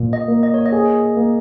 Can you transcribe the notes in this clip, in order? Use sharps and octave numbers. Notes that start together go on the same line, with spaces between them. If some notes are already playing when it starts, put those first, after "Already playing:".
Already playing: A#2 A#3
D#5
A#3
D#5
C#5
D#5
G#4
A#3